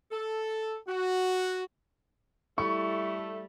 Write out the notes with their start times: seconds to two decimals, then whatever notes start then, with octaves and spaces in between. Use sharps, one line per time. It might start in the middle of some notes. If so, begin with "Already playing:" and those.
0.12 A4
0.87 F#4
2.58 G3 A3 E4 C#6